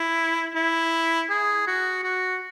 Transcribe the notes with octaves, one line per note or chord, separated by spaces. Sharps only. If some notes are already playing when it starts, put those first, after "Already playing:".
Already playing: E4
E4
G#4
F#4
F#4